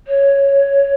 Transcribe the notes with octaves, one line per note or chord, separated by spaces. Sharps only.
C#5